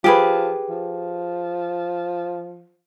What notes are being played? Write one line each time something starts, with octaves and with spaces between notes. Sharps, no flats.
F3 G4 G#4 B4
F3